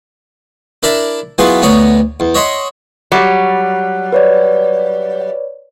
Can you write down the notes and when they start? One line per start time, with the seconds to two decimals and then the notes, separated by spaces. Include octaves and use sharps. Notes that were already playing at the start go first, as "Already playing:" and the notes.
0.83 D4 E4 A#4 D5 E5 A5
1.38 E3 F#3 B3 F4 G#4 B4
1.62 D2 B3 C#5 D5 A#5 D#6
2.20 E2
2.35 C#5 D#5 E5 F#5 C6
3.12 F#3 G3
4.13 B4 C#5 D5